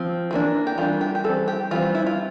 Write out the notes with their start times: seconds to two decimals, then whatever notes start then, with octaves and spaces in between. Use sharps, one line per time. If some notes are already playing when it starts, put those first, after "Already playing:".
Already playing: F3 C4
0.31 E3 G3 A#3 D4
0.67 G4
0.78 E3 G3 A#3 D4 F4
1.01 G4
1.15 G4
1.24 E3 G3 C4 A4
1.48 G4
1.71 E3 G3 C4 F4
1.95 E4
2.07 F4